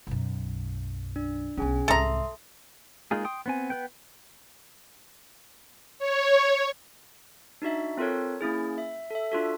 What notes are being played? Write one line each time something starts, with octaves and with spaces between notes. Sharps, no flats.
B1 F#2
D4
B1 C#4 D4 G#4 G#5
C2 G#2 A4 E5 A#5 C6 D#6
G#3 A#3 D#4 F4 G#4
G5 C6 D#6
B3 C4 G#5
B3 B4 G5
C#5
D4 D#4 F#4 E5
C4 F4 A4 A#4 C#5
A#3 C#4 E4 G#4
E5
A4 E5
D4 F4 F#4 A4